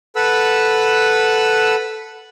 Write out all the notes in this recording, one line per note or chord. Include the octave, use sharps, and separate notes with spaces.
A4 B4 F#5 B5 E6